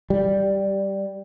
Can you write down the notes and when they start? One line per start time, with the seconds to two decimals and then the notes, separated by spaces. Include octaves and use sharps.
0.10 G3